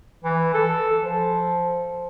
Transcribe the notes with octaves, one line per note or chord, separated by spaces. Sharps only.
E3
A4
F3